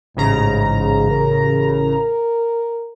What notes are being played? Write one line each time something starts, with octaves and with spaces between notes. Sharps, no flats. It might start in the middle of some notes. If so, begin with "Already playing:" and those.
A1 G#2 C#3 A#5
A#4